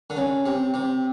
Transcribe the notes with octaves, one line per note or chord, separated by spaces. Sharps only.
D3
C#3
C3
C3